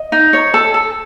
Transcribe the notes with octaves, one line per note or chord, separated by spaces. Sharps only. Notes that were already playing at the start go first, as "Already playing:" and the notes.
Already playing: D#5
D#4
C#5
A4
A4